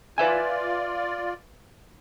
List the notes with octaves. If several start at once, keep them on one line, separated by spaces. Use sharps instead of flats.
F4 B4 D5 E5 G#5